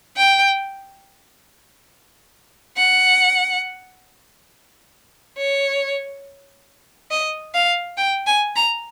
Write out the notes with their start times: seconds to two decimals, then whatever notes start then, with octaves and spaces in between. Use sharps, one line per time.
0.17 G5
2.78 F#5
5.38 C#5
7.11 D#5
7.54 F5
7.97 G5
8.27 G#5
8.56 A#5